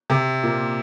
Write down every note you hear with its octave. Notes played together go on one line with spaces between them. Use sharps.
C3
A#2